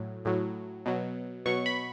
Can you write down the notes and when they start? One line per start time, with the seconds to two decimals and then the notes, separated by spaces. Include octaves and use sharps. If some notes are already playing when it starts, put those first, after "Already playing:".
Already playing: A2 F#3
0.25 A2 F#3
0.86 B2 F#3
1.46 B2 F#3 C#6
1.66 B5